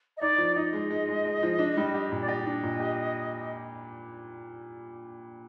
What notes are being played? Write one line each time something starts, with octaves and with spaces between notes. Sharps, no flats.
D#5
D#4 D5
F3
D#4 D#5
G#3
G#3
G#3
G#3
F3
D4
G3
G4
A#2
D5
G4 D#5
D4
A#2
G4